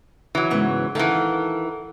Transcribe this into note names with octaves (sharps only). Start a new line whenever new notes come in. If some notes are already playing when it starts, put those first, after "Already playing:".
E3 F#3
G#2 C#3 B3
D#3 E3 A4 F5 F#5